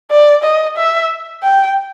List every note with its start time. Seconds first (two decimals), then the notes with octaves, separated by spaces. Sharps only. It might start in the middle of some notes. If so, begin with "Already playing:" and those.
0.11 D5
0.44 D#5
0.77 E5
1.43 G5